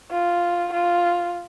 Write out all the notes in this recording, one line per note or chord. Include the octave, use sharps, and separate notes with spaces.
F4
F4